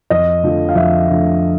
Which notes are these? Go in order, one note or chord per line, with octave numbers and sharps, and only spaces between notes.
F2 D#5
D3 F3 A3
F5
F2 E5
D3 F3 A3